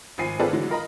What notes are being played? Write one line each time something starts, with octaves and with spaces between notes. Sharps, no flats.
G#1 F3 G#5 C7
C4 F4 G#4 A4 B4 D5
D3 E3 F#3 G#3
F4 A#4 D#5 B5